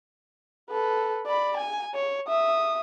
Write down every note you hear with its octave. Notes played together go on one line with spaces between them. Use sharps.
A4 B4
D5 B5
G#5
C#5
E5 D#6